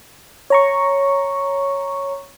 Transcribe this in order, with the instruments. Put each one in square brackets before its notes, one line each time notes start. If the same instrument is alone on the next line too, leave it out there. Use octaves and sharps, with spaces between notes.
[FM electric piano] C#5 A#5 C#6